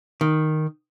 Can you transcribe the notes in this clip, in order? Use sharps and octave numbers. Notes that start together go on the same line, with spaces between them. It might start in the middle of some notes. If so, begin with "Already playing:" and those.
D#3